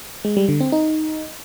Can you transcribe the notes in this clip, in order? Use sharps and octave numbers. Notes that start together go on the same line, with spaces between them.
G#3
G3
D3
C4
D#4